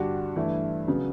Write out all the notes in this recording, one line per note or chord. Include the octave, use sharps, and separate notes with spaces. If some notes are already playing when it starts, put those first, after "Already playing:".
Already playing: G2 D3 G3 D4 F#4
G2 E3 A3 E4
C#3 F#3 B3